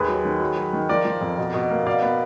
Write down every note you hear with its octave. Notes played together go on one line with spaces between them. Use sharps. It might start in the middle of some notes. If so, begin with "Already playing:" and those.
Already playing: D#2 G#4 B4
F#3
D#3
F#3
F#3
D#3
F3 A#4 D5
F3
F2
B2
B2
A#3
B2 D5 F5
B3